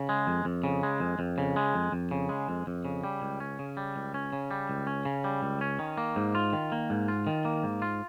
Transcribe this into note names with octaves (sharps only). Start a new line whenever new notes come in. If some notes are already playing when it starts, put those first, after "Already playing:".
Already playing: C#3
G#3
F2
F2
C#3
G#3
F2
F2
C#3
G#3
F2
F2
C#3
G#3
F2
F2
C#3
G3
C#2
C#4
C#3
G3
C#2
C#4
C#3
G3
C#2
C#4
C#3
G3
C#2
C#4
D#3
A#3
G#2
F4
D#3
A#3
G#2
F4
D#3
A#3
G#2
F4